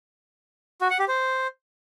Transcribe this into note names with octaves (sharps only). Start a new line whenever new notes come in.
F#4
F#5
G4
C5